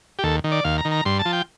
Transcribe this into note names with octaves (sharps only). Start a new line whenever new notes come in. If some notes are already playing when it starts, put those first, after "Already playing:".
G4
D#2 A4
D#3
D5
D#2 F5
A#5
D#3
A#5
G2 C6
A5
F3
G5